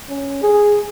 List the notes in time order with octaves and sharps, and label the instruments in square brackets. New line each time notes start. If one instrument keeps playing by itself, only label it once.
[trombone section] C#4
G#4